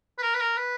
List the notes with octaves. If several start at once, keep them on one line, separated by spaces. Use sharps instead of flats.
B4
A#4
B4
A#4
B4